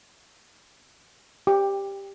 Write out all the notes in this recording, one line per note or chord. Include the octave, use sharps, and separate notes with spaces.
G4